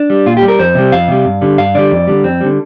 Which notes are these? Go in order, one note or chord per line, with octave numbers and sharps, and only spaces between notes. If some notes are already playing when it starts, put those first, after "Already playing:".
Already playing: D4
G3
A#2 F4
G4
G3
A#4
F2 C5
C3 G3
F2 F5
C3 G3
G2
D3 G3
G2 F5
D3 G3 D5
F2
D3 G3
F2 C4
D3 G3